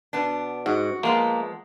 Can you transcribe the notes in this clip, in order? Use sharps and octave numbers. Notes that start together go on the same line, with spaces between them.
B2 B3 D4
G#2 F#4
F3 G#3 A#3 B3